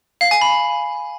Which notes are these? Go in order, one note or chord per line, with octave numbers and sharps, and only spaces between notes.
F5
G#5
B5